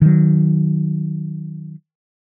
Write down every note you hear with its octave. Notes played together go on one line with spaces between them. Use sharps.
D#3 F#3